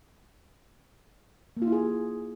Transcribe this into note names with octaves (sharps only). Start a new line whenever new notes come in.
A#3
F4
E4
G#4